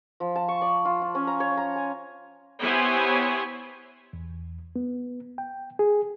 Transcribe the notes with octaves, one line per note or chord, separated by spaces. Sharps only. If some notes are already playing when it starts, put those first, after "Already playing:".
F3
A5
C#6
D5
F4
F4
C#4
A#5
C#5
A#5
G#5
B3 E4 G4 C5 C#5 G#5
E2
B3
G5
G#4